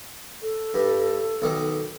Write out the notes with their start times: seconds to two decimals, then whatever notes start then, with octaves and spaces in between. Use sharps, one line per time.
0.42 A4
0.74 G2
1.42 B1 D#3